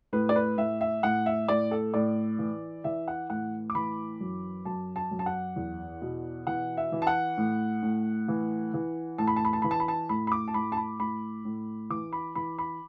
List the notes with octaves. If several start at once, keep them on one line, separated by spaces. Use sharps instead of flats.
A2 B4
D5
B4
A2 E5
E5
A2 F#5
E5
A2 D5
A4
A2 D5
E3
E3 E5
F#5
A2 F#5
D6
E3 B5
F#2
F#2 A5
A5
F#2
A5
F#5
E2
B2
E3 F#5
E5
E3
A5
F#5
A2
A2
E3
E3
A2 A5
B5
A5
B5
A5
E3 B5
A5
B5
A5
A2 B5
B5
D6
A5
A2 B5
A5
B5
A2 B5
A2
E3 D6
B5
E3 B5
B5